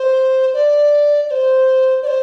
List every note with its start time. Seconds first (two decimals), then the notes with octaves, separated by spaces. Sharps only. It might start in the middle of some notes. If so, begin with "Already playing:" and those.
Already playing: C5
0.54 D5
1.28 D5
1.31 C5
2.03 D5
2.07 C5